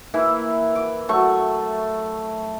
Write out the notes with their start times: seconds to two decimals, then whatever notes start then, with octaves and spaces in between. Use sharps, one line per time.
0.14 E3 A#3 E4
0.76 D6
1.09 F#3 A3 C#6